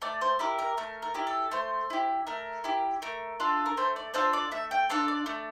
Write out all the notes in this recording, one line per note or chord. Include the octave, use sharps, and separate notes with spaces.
A3 D5
C5
E4 G4 A#4
A#4
A3 A#4
A#4
E4 G4
A4
A3 C5
E4 G4
A3 A#4
E4 G4
A3 A#4
D4 F4 A4
A#4
A3 C5
D5
D4 F4 A4 C5
D5
A3 E5
G5
D4 F4 A4 F5
D5
A3